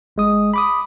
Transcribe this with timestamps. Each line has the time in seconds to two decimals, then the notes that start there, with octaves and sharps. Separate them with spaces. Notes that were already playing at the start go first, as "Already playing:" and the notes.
0.16 G1 G#3 D#6
0.54 B5 D6 D#6